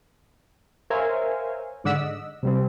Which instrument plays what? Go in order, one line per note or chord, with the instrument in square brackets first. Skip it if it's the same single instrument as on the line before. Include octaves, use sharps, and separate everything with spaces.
[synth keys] A#4 C5 C#5 E5 F5 G#5
G#2 D3 D5 F#5 E6 B6
D#5
C3 G3 C4